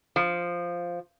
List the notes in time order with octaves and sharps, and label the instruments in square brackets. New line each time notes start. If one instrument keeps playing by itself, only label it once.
[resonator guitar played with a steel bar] F3